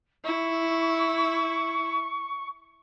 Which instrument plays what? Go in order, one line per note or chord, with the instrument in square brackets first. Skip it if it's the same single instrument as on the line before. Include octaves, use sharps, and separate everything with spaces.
[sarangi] E4 [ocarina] C#6